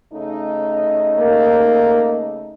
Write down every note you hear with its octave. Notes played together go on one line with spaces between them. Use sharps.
C#3 A3 D#4
A#3